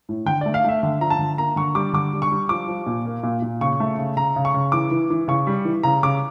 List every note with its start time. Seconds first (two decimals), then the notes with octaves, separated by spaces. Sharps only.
0.09 A2
0.26 D3 G5
0.41 A3 D5
0.54 F5
0.64 A3 E5
0.83 D3 E5
1.01 F3 A#5
1.10 A5
1.19 D3
1.38 A#3 A#5
1.56 D3 C#6
1.75 G3 D6
1.93 D3 D6
2.13 G3
2.22 C#6
2.32 G3
2.49 F3 D6
2.68 F3
2.86 A#2
3.05 A#3
3.23 A#2
3.42 A#2
3.61 C#3 C#6
3.80 A3
3.98 C#3
4.17 C#3 A#5
4.36 C#3
4.45 C#6
4.54 C#3
4.72 E3 D6
4.91 E3
5.10 E3
5.28 C#3 C#6
5.47 G3
5.65 E3
5.83 C#3 A#5
6.03 C#3 D6